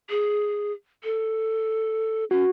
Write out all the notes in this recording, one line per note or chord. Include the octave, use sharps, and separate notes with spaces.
G#4
A4
C#4 F#4